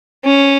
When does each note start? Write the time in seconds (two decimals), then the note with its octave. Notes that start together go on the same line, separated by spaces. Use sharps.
0.25 C#4